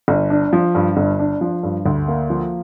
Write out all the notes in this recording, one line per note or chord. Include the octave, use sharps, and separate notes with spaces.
G1
D4
F3
G2
G1
D4
F3
G2
D2
A#3
F3